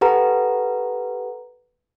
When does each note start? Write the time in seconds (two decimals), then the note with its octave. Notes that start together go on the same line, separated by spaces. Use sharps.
0.01 G4 A4 B4 F#5 A#5